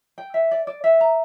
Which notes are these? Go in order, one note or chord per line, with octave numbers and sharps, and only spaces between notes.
G5
E5
D5
D5
E5
A#5